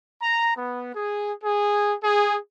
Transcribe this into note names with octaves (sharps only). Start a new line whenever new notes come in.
A#5
B3
G#4
G#4
G#4